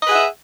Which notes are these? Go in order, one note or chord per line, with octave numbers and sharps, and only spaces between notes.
G#4 B4 D#5 E5 F#5